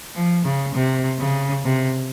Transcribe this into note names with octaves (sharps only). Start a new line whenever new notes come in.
F3
C#3
C3
C#3
C3